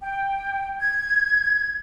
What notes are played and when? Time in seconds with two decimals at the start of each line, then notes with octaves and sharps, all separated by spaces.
0.01 G5
0.78 G#6